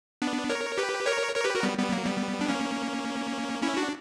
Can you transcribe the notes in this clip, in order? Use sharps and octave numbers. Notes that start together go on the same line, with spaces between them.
B3 D4
A#4 C#5
G4 B4
A#4 C#5
A#4 C#5
G4 B4
F#4 A#4
G3 B3
G3 B3
F#3 A#3
G3 B3
D4
A#3 C#4
C#4 E4
D4 F#4